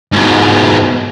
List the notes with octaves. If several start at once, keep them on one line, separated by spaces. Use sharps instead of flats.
G#2 B2